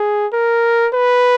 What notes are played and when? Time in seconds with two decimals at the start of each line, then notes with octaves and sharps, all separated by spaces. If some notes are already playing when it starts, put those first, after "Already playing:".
Already playing: G#4
0.33 A#4
0.94 B4